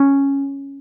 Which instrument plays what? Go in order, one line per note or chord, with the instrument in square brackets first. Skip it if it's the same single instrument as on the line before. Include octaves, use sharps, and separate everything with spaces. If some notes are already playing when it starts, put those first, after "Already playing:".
Already playing: [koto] C#4